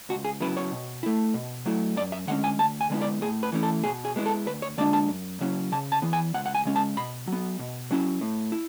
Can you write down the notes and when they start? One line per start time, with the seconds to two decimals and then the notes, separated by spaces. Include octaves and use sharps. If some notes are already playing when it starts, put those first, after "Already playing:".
0.09 C#2 F#4
0.24 G#4
0.41 C#3 F#3 B3 E4 B4
0.57 C#5
0.71 B2
1.03 A3 E4
1.34 B2
1.66 F#3 A3 E4
1.96 F#2 D5
2.12 E5
2.27 D3 G#3 C#4 F#5
2.44 G#5
2.59 D2 A5
2.81 G#5
2.90 D3 G#3 B3 E4
3.01 D5
3.21 A2 G#4
3.43 B4
3.52 E3 A3 C#4 E4
3.63 A4
3.84 B2 G#4
4.05 G#4
4.16 G#3 B3 E4
4.26 A4
4.46 D2 B4
4.62 C#5
4.78 D3 G#3 D4 D5
4.93 A5
5.08 F#2
5.40 C#3 F#3 C#4 E4
5.72 C#3 A5
5.92 A5
6.02 E3 B3
6.13 G#5
6.34 C#2 F#5
6.46 F#5
6.55 G#5
6.65 C#3 G#3 C#4
6.76 A5
6.97 B2 B5
7.27 F#3 B3
7.59 B2
7.91 F#3 C#4 E4
8.21 A2
8.52 E4